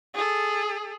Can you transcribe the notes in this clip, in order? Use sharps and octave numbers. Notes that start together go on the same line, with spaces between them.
G#4 A4